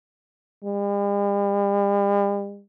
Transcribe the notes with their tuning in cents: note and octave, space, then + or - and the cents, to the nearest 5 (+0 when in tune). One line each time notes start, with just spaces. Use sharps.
G3 +45